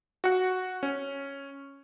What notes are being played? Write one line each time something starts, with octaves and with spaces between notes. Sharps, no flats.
F#4 F#5
C#4